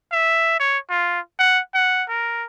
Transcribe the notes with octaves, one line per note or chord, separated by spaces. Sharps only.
E5
C#5
F4
F#5
F#5
A#4